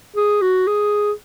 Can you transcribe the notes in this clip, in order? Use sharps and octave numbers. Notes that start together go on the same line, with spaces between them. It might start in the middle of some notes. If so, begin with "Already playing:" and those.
G#4
F#4
G#4